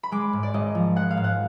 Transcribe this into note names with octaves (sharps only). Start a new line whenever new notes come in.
B5
G#3 D6
G#2
D5
G#1 D#5
F3
G#3 F#5
F5
G#2
F#5